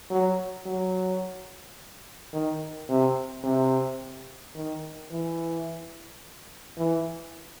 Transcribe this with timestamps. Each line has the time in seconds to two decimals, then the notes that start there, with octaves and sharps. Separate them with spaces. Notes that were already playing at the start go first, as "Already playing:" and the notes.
0.10 F#3
0.66 F#3
2.33 D#3
2.89 C3
3.44 C3
4.55 D#3
5.11 E3
6.78 E3